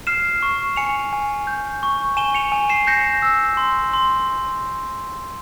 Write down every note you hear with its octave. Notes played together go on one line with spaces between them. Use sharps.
F6 C7 E7
C#6
G#5 C#7 F7
G#5
G6
C#6
G#5 E7 G7
C#7 F7
G#5
C7 E7
G6 A#6 C#7
E6
C6
C6